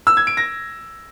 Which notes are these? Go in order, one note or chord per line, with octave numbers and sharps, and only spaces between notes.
E6
G#6
D7
A#6